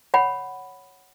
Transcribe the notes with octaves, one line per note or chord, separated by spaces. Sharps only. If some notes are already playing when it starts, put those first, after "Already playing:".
C#5 F#5 B5